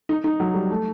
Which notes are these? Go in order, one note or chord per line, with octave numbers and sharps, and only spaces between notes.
D#4
D#4
F#3
G3
A3